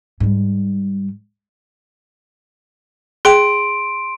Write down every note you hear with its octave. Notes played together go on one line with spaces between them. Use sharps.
G#2 G3
G#4 G5 C6 D7